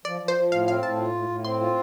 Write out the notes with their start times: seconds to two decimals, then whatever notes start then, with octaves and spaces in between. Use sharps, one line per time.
0.05 F3 D5
0.21 F3
0.28 C5
0.37 F3
0.52 A2 F5
0.67 C4 F5
0.83 A2 A5
0.98 F4
1.14 A2
1.29 A2
1.45 C4 C6
1.61 F4